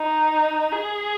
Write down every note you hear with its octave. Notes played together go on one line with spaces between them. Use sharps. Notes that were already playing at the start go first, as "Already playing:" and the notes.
Already playing: D#4
G#4